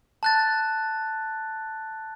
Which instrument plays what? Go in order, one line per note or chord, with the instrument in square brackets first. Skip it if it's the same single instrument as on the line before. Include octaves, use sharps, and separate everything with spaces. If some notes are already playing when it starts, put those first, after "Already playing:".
[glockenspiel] A5 F#6 A6